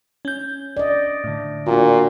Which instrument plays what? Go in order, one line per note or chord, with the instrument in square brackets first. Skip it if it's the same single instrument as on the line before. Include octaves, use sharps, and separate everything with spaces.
[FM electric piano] C#4 G6
[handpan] D5 D#5
[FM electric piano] A2 D3
[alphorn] A#2 [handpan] D4 F4 F#4